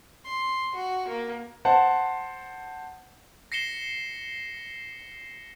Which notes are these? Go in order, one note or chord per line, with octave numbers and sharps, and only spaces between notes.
C6
F#4
A#3
C5 F#5 A5
A#6 C7 C#7 E7 G7